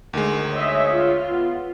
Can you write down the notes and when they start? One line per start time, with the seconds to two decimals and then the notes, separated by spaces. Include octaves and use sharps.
0.13 D2 D#3 G#3
0.52 C#5 D#5 E5
0.89 F4
1.31 B3